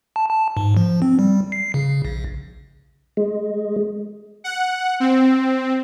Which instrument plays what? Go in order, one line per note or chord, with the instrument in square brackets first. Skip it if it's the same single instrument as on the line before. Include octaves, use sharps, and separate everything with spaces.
[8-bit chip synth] A5
A5
G#2
F3
C4
G3
C7
C#3
A#1
[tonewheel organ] G#3
[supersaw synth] F#5
C4